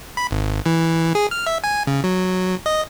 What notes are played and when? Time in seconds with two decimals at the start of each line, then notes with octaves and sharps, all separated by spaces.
0.17 B5
0.31 G#1
0.66 E3
1.15 G#4
1.31 F6
1.47 E5
1.64 G#5
1.87 C#3
2.04 F#3
2.66 D#5